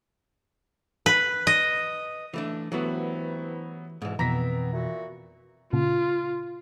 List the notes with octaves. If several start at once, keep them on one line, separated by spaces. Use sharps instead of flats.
B4
D#5
E3 A3 D4
G2 E3 F#3 A3 B3 C4 E4 F#4
D2 G#2 B2 E3
F2 B2 E3 B3 C4 A#5 A#6 B6
A#2 E4 F#4
A#2 C#3 F4